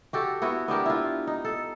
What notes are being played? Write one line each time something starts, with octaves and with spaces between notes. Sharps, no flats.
F#4 G4 A4
B3 E4 F#4
B3 D4 G4 A#4
E4 F4
D#4
A4